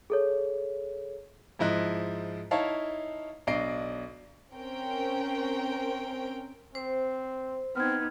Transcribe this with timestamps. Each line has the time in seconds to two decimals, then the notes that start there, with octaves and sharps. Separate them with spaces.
0.10 G#4 A4 C#5
1.59 G#2 F3 E4 D#5 F#6
2.51 D#4 E4 C#5 F5 A5
3.47 B1 D4 D#5 C7 D7
4.54 C4 C#4 A#4 G5
6.75 C4 C5
7.76 B3 C4 D#4 F6 G#6